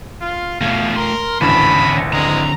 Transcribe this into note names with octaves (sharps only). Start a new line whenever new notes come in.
F4
E2 B2 A3 F4 F5
A#4 C6
G#1 D2 C#3 E3 B3 A5 B5
D3 G#3 C4 A#5